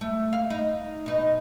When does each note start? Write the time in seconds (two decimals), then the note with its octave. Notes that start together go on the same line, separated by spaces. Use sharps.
0.01 A3
0.33 F5
0.50 D#4
1.06 B2 D#4